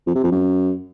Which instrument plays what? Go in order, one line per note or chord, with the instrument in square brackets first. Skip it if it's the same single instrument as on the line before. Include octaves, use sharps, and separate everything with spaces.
[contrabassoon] F2
C3
F2
F#2